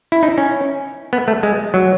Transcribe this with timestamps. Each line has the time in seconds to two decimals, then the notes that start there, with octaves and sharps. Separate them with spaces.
0.12 E4
0.23 D#4
0.38 C#4
1.13 B3
1.28 A3
1.43 G#3
1.74 F#3